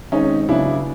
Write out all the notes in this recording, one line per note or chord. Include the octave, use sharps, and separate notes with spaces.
D#3 G#3 C4 C#4 D#4
C#3 F#3 B3 D4 E4